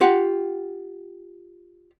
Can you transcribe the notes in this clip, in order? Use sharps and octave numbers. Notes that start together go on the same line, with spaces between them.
F4 G4 F#5